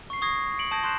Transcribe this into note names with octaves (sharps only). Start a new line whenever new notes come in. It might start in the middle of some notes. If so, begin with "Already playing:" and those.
C#6 C7
C#6 D#6 G#6 A#6 C7
C#7 D7 F#7
A5 D#6 G6 G#6 A#6 D7
C6 F#6 G6 C7 E7